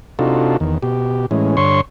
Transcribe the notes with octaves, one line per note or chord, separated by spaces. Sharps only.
C3 D4 D#4 F4 F#4 A4
E2 D#3
B2 G4
A2 E3 G#3 C#4
G2 D3 C#5 C6 C#6